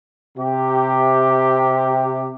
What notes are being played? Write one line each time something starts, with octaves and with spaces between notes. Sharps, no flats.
C3 G4